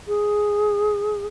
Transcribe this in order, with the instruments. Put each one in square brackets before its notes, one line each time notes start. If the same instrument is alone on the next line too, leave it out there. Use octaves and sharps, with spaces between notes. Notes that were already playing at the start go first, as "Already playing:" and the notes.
[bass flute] G#4